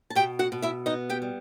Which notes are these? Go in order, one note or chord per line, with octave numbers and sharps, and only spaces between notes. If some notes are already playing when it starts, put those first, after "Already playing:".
A5
B2 G4 G5
F#4 F#5
B2
E4 E5
B3 D#4 D#5
G4 G5
G3